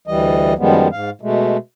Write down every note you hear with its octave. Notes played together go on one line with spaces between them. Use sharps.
D2 E3 G3 D#5
F#2 D#3 F3 G3 G#3 B3
G#2 F5
B2 G#3 A3